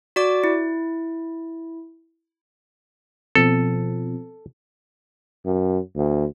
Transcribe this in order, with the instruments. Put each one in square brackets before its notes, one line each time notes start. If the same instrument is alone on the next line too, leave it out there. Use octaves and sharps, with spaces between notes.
[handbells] F#4 D5 D6
E4
[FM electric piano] B2 F3 C4 [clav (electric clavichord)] A4
[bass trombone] F#2
D2